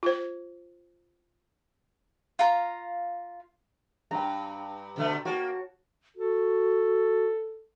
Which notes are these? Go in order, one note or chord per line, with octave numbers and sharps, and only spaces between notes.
F4 C5
F4 F5 A#5
G2 G5 A#5
B2 D3 A3
A#3 F#4 C#5 A5
F#4 A4